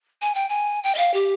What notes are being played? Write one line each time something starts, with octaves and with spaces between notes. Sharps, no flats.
G#5
G5
G#5
G5
D#5
F5
G4